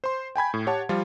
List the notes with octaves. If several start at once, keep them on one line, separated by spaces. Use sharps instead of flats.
C5 C6
G5 G#5 B5 G#6
A2
G4 C#5 F#5 A5
F3 G3 F4